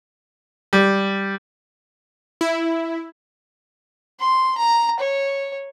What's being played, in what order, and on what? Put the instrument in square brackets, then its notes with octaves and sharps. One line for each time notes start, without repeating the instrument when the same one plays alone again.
[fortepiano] G3
[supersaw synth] E4
[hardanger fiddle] C6
A#5
C#5